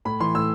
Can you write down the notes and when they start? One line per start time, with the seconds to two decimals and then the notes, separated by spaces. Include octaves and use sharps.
0.05 A2 B5
0.20 E3 C6
0.35 A2 E6